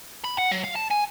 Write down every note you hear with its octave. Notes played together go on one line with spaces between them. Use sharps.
B5
F#5
F#3
F5
A5
G#5